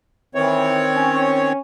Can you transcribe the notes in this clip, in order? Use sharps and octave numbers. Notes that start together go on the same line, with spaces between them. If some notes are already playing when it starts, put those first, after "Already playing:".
D#3 E3 C4 C#5
C#4